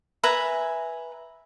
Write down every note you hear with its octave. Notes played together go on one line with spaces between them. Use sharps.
B4 E5 G#5 A#5